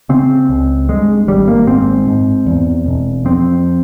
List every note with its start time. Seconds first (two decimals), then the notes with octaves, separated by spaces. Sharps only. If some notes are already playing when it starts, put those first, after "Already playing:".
0.09 C#3 C4
0.49 C#2
0.88 G2 G#3
1.28 G#1 G3
1.48 A#3
1.67 G#2 C4
2.07 G#2
2.46 E2
2.86 E1
3.25 F2 C4